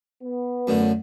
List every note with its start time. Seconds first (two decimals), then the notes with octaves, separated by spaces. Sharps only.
0.23 B3
0.67 F#2 A2 D3